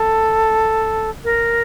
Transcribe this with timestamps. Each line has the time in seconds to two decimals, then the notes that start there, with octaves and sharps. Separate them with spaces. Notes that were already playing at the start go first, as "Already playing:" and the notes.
Already playing: A4
1.24 A#4